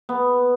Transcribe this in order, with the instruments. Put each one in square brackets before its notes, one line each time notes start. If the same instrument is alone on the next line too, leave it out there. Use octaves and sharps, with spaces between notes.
[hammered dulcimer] B3